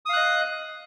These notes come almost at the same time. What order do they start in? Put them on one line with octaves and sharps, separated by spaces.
D#6 F5 F#6 D#5